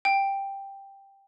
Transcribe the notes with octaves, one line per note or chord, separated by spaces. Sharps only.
G5